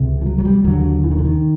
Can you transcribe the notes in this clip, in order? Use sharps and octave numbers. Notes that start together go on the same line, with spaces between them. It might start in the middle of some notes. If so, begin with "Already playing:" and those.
Already playing: C#2 C3
F3
F#3
F#3
G3
D#2 D3 F#3
E3
D#3
D3
D#3